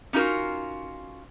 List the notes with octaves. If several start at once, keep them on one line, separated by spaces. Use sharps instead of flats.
C#4 D#4 F4 F#4 A#4